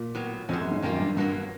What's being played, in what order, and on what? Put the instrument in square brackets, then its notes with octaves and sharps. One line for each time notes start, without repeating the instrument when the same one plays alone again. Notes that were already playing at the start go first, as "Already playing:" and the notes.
Already playing: [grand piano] A#2
[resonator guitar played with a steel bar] A2 F#3 B3
[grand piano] F2 [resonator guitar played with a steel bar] B2 G#3 C#4
[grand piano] F#2
G#2
[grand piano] F#2 [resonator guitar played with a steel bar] D#3 G3 A#3 D4 F4
[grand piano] G2
[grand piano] G2 [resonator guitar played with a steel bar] B2 F#3 A#3